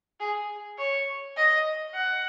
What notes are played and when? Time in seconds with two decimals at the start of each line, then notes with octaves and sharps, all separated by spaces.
0.20 G#4
0.78 C#5
1.37 D#5
1.95 F#5